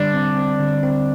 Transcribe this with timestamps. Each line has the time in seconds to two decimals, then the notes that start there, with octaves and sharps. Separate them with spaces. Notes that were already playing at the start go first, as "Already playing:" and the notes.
Already playing: D3 G3 D4
0.14 C4
0.37 C4
0.60 D3
0.83 C4